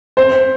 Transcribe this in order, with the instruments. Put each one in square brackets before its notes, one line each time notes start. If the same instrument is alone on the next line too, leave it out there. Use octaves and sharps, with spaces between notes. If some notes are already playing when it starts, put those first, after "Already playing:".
[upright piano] C5